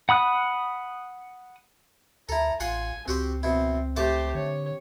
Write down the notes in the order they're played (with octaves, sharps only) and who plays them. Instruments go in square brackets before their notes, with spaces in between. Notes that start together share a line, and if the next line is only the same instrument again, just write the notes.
[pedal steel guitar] F#5 B5 D#6 F#6
[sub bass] D2 [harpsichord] E4 A4 [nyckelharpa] A#5
[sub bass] A1 [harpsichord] F4 F#5 C6 [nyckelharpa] G#5
[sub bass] C#2 [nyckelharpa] C4 [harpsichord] F#4 G4 C5
[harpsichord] B2 E4 [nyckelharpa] C4
[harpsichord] A3 A5 D6 [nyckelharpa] G4 C5
[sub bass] D3 [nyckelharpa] C#5